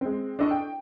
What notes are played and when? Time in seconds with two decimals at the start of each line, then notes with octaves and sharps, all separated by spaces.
0.01 G#3 C4
0.39 D4 A4 D#5 C#6
0.51 G5